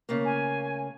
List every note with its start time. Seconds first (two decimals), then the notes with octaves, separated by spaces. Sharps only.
0.09 C#3 A3 A#3
0.25 G#5